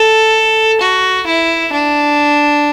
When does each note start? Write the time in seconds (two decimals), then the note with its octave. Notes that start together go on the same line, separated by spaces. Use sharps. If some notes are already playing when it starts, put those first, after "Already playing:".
Already playing: A4
0.81 F#4
1.26 E4
1.72 D4